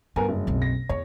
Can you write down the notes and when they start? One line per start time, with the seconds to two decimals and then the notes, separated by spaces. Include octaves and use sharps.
0.16 G2 B3 A#4 G#5
0.28 F#1
0.47 B1 C4
0.62 A#6
0.89 E2 C#5